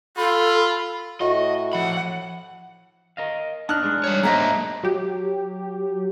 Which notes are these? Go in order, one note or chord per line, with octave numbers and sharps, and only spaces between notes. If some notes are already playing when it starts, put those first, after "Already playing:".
F4 A4 B5
A2 F#4 D#5
F3 F#5 B5
A#4 D#5 F5
D4 D#4 A5 F6 F#6
G#3 D4
G3 C#5
F#3 A#3 C5 D#5 E5 A#5
F#3 G4